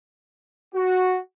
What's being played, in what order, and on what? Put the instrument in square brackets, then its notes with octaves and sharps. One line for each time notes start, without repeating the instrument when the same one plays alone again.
[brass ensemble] F#4